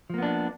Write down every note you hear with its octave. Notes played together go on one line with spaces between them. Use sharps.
F3 A#3 B3 D4